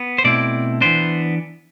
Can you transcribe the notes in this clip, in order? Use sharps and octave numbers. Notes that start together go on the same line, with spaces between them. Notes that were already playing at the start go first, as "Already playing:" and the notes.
Already playing: B3
C5
B2 A3 C4 E4 D5
E3 B3 D4 C5